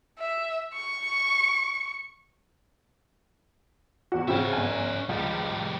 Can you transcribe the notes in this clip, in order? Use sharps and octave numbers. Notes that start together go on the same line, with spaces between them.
E5
C#6
E2 F#4
C#3 C4 C#4 F#4 E5
G1 G#5
C#2 F3 G3